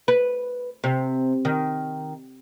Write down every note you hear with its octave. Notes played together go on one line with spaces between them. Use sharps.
B4
C3
D#3